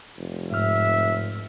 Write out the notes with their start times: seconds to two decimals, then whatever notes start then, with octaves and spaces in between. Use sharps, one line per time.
0.18 F1
0.52 G#2 E5 F6